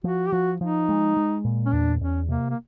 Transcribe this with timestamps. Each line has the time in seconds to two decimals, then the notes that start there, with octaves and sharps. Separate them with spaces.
0.04 F3 F#4
0.26 G4
0.32 F3 F#4
0.60 F3 D#4
0.89 G#3
1.17 G#3
1.45 A#2
1.66 C#4
1.73 E2 D4
2.01 E2 C#4
2.28 C3 A#3
2.50 A#3